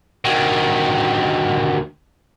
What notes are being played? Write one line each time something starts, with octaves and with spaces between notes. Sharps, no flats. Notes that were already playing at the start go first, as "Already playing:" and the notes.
D2 D#3